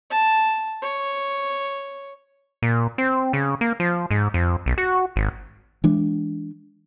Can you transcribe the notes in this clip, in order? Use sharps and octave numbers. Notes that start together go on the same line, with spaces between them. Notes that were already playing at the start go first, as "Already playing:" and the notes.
A5
C#5
A#2
C4
C#3
A#3
F3
G#2
F2
B1
F#4
G#1
E3 G#3 D4